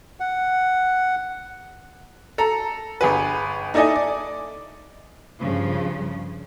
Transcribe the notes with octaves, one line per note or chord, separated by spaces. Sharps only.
F#5
A4 A#5
G1 G#4 B4
D#4 E4 A4 D5 D#5 G#5
D5
G2 C#3 F3